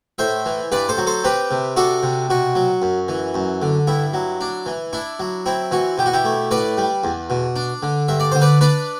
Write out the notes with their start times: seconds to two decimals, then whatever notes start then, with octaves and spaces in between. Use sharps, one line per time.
0.18 A2 C5 E5
0.46 E3
0.72 G2 B4 D5
0.89 A4 C5
0.98 F#3
1.07 A4 C5
1.24 C4 G4 B4
1.51 C3
1.76 D4 F#4 A4
2.03 C3
2.30 B2 F#4
2.55 F#3
2.82 F#2
3.08 E3
3.34 F#2
3.62 D3
3.87 G2 E4
4.14 F#3
4.41 D4
4.66 E3
4.93 D4 E4
5.20 F#3
5.46 C4 E4
5.71 E3 F#4
5.98 B2 G4
6.06 F#4
6.13 E4 G4
6.25 A3
6.51 A2 B4 D5
6.77 G3
7.04 E2
7.30 B2
7.56 D4
7.83 D3
8.08 G2 E5
8.20 D5
8.32 D3 C5
8.41 B4 D5
8.61 D4 B4 D5